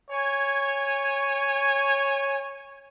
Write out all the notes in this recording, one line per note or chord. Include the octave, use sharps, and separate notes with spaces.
C#5 G#5